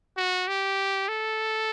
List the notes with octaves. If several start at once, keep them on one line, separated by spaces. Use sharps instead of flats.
F#4
G4
A4